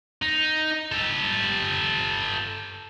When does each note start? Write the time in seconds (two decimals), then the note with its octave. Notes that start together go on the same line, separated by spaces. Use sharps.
0.22 D#4
0.92 G4 A4